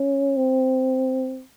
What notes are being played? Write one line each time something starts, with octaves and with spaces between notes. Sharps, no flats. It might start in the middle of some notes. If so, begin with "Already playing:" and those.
Already playing: C#4
C4